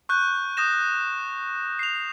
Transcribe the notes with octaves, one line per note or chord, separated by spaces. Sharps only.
C#6 F#6 G6
D#6 G6 A#6 E7
C7 F7